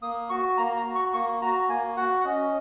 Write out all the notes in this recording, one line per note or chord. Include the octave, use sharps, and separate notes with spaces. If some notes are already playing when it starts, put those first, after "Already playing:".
A#3 D#6
F#4 C#6
A#3 A#5
A#5
F#4
C#6
A#3 C#6
F#4 A#5
A#3 G#5
F#4 F#5
F#5
C#4 D#5